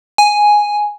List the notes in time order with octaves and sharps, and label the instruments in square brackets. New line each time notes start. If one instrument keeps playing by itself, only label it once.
[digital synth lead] G#5